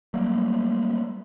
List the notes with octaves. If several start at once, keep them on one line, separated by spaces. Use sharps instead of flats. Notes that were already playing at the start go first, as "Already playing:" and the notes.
F#3 G3 A3 A#3